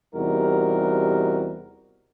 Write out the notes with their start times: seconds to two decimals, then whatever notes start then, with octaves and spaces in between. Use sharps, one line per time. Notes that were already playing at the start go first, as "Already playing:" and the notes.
0.15 E2 C3 G3 D#4 F#4 A#4